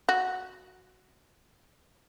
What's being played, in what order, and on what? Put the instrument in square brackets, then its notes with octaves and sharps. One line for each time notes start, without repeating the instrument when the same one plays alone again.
[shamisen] F#4